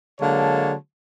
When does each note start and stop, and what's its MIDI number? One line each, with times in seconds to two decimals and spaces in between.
0.20 0.73 50
0.20 0.73 54
0.20 0.73 56
0.20 0.73 58
0.20 0.73 73
0.20 0.73 81